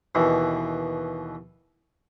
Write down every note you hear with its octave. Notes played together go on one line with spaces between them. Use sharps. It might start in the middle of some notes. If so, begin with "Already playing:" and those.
D#2 B2 E3